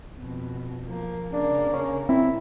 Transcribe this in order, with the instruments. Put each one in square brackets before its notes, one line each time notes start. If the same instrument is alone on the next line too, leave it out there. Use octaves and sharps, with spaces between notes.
[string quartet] F2 B2
F3 A#3
[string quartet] C#3 A#3 [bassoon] D4
[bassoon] C#4
[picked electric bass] C4 [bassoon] E4